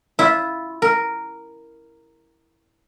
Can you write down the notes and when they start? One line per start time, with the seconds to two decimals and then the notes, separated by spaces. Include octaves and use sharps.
0.19 E4 F4
0.82 A#4